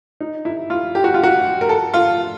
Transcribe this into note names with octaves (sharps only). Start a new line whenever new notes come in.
D#4
E4
F4
G4
F#4
F4
F#4
A#4
A4
F4